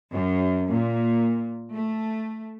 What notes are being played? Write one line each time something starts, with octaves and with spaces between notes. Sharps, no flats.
F#2
A#2
A3